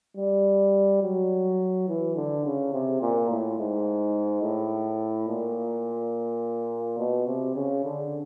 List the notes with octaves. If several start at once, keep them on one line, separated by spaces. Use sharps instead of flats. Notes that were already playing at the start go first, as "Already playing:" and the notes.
G3
F#3
E3
D3
C#3
C3
A#2
A2
G#2
A2
A#2
B2
C3
C#3
D3